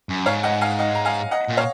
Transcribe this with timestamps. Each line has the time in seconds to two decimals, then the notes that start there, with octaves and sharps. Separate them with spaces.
0.09 F#2
0.26 G#2 C#5 F5
0.43 D#5 F#5
0.61 F5 G#5
0.79 D#5 F#5
0.95 A#5
1.05 F5 G#5
1.31 D#5 F#5
1.49 A#2
1.57 C#5 F5